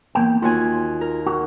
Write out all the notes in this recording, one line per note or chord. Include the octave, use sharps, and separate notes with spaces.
E2 A#3 G5
D#2 F4 F#4 G#5
A#4
F#4